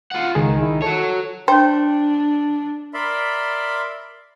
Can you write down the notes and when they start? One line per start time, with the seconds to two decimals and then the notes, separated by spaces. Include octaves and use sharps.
0.11 F4 F#5
0.35 C#2 D#3 G#4
0.59 C2 E4
0.82 F#4 A4 C#5
1.48 D4 C5 C#5 G5
2.94 A#4 D5 E5 B5 C6